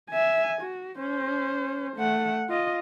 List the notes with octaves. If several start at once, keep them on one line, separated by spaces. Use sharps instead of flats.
E5 G#5
F#4
C#4 C5
A3 F#5
F4 D#5